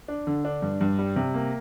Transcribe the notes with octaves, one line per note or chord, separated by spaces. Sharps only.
D4
D3
D4
G2
G2
G3
C3
A#3